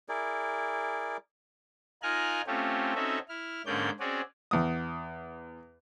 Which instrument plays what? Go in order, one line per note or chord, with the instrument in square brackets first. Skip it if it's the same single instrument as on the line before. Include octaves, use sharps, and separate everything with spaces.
[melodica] E4 G#4 A#4 D5
[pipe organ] D#4 F4 A#4 G#5 F6 F#6
A3 C4 C#4 F4 G4
C4 C#4 D#4 F#4 A4 E5
E4 F6
G#2 D3 A#3 C#4 D5 G6
C4 C#4 F#4 G#4 D5
[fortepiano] E2 D#6